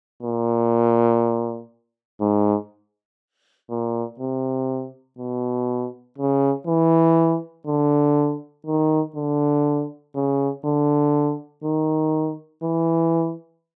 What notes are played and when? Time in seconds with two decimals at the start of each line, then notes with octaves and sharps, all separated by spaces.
0.23 A#2
2.21 G#2
3.70 A#2
4.20 C3
5.19 B2
6.18 C#3
6.68 E3
7.67 D3
8.67 D#3
9.16 D3
10.15 C#3
10.65 D3
11.64 D#3
12.63 E3